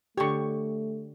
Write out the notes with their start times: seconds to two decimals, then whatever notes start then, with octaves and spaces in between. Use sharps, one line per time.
0.17 D3 A3 G4 C#5 C#6